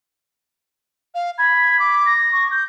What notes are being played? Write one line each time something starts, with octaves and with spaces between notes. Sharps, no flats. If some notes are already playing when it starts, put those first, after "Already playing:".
F5
B5 G#6
D6
A#6
C#6
G6